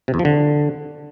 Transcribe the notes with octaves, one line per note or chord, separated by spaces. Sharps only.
C3
E2
F3
D3